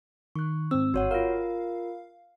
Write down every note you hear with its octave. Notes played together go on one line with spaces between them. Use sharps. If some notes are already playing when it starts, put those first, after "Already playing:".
D#3 C#6 F#6
G#2 C4 E6
G1 F#4 C#5 F#5
F4 A#4 F5